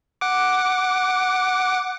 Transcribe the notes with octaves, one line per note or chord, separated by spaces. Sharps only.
F#5 D6